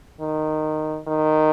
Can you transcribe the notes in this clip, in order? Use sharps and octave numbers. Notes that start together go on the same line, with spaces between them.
D#3
D#3